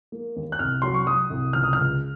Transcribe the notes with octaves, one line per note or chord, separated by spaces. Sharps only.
A#3
D#2
F#6
C2 F6
F#3 C6
C#6
F#3 D#6
C2
C#2 F6
D#6
C#2 F6